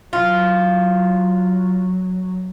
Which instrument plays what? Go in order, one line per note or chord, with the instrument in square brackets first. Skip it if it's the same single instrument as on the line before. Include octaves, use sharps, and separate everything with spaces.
[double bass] F#3 [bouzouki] F4